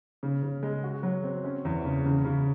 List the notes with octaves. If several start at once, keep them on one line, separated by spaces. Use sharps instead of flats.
C#3
C#3
G#3
F#4
F#3
C4
C#4
E2
C#3
C#3
C#3